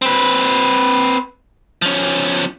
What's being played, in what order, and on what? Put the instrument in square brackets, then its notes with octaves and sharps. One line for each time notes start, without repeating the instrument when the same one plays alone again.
[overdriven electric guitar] C4 B4
F3 C#4